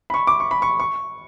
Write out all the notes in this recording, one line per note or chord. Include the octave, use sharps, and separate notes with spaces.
B5
C#6
D6
C#6
B5
C#6
C#6